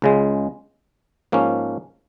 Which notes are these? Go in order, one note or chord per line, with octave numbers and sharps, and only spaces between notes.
C#2 C#3 G#3
G#2 F3 A#3 C#4